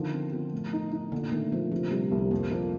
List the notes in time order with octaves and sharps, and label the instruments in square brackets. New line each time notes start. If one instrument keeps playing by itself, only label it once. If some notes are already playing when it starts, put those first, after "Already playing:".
Already playing: [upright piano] D3 F3 [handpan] D#3
[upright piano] C4
F3
A2
D#4
D#4
[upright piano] A#2 [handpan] D3
[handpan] D#3 [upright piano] A3
[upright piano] A#2 [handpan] F3
[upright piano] C3 [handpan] F3
[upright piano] C3 [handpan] G3
[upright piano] C2
[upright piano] F2 [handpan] A#3
[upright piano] F2